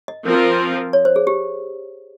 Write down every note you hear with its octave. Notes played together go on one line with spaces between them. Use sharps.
D#5
F3 C4 F4 A#4
C#5
C5
G#4
G4